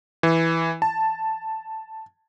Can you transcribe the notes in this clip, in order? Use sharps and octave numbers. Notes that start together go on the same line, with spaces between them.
E3
A5